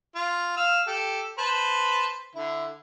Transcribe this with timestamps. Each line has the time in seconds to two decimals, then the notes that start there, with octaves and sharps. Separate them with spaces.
0.15 F4
0.57 F5 E6
0.87 G4 A4
1.38 B4 C5 A5
2.35 D3 E4